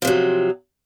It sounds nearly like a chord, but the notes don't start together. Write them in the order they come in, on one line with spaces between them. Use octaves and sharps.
F3 C3 F#3